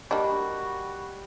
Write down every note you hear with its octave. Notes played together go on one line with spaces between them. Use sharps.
G3 A#3 D4 F#4 D#5